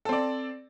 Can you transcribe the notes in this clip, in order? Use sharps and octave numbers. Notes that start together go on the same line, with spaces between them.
C4 A4 D5